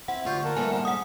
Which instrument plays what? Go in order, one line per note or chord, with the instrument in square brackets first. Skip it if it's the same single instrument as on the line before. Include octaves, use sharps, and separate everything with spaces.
[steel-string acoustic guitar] C4 E4 [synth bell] F#5
[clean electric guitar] D2 [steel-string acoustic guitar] G3 F4 [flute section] C#6 G6
[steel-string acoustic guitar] A#3 F4 [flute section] A#4 F#5 A5
[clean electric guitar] G2 A#2 [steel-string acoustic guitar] A3 B3 A4 [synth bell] G#5
[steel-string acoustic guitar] C5
[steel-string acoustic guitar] G#2 [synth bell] F#5 D#6